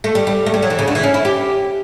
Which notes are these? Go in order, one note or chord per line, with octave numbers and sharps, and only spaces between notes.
A3
G3
G3
A3
G3
F#3
E3
C#3
D3
E3
C#4
E4
G4